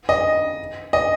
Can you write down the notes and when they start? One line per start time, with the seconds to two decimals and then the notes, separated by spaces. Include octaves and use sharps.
0.09 D#5
0.93 D#5